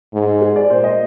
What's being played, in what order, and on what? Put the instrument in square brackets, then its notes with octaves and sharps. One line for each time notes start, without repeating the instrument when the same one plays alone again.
[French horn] G#2
[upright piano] G#4
D5
[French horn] A#2 [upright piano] C5
[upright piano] D#5